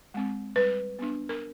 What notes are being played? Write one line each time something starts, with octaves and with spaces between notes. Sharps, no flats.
G#3 C4
G3 B4
B3 D4
A#4